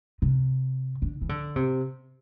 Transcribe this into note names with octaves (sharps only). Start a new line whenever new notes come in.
C3
D3
E3
D3
C3